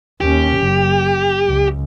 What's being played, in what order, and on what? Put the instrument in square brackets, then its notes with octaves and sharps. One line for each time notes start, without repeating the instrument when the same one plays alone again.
[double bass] D#2 C#4 [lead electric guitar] G4
[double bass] F#1
C#2